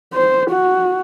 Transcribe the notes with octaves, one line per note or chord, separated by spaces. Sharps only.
C5
F#4